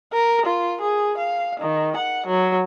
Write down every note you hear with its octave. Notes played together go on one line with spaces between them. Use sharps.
A#4
F4
G#4
F5
D#3
F#5
F#3